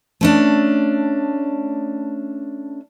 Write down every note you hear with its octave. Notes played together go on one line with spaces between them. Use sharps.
A3 C#4 D4